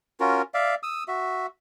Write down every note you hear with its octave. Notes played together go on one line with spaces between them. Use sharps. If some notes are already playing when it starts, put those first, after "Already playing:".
C#4 F4 F#4 A#4
D5 E5 F5
D#6 E6
F#4 E5